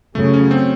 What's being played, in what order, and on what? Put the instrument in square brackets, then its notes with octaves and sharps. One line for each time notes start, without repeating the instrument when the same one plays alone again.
[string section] F#2 C#3 F#3 [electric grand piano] A3
[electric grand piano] C#4
C4